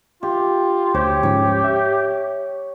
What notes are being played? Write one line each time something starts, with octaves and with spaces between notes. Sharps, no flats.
F4 G4
D2 G4 C5 C#5
G#2 F3 C#4 C#5
E5